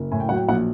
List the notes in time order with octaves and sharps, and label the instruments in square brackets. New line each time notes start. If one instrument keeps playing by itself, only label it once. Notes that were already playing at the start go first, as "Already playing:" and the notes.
Already playing: [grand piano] F#1
A2 G#5
G5
F#3 F#5
G5
A#1 F#5